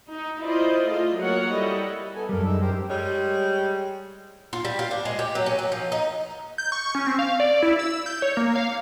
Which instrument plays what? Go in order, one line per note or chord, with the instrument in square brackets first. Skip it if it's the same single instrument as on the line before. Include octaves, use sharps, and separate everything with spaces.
[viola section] D#4
E4 F4 C5 D5 D#5
A3 F4 G#4 D#5
F#3 A#3 A#4 C#5 F#5
G3 E4 A4 D#5
[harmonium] B3 A4 G#5
[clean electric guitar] F#2 G3 [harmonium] A4 A#4
[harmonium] G#3 D#4 E5
G4 A#4 C5
[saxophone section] G3 G#3 C#5
[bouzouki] F4
G3
F4
D4
G#3
G4
F#3
C#4
F#3
F3
D#4
[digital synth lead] G6
C#6
C#4
C4
F5
D5
E4
E6
G6
C#5
A#3
F5